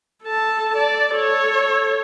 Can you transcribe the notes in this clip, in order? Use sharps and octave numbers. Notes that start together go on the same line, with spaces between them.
A4 A5
D5
A4 C#5